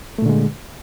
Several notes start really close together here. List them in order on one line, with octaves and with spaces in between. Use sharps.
A3 A#2 D3 G#3